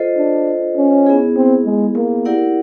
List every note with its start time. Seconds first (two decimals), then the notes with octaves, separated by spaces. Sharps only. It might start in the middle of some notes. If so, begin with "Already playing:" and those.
Already playing: F4 A4 C5 D#5
0.18 D4
0.77 C#4
1.07 B3 E4 G#4
1.36 C4
1.65 G#3
1.96 A#3
2.25 E4 G4 A#4 D5 F#5